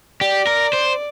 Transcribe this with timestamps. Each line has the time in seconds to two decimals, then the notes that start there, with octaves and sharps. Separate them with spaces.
0.21 G4 D5
0.47 A#4
0.73 C5